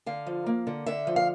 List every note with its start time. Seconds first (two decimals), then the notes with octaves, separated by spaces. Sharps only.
0.06 D3 F5
0.26 F3
0.46 A#3
0.67 D3
0.86 D3 E5
1.07 F3
1.16 F5